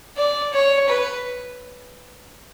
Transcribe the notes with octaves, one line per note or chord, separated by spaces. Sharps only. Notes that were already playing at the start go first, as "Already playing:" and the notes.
D5
C#5
B4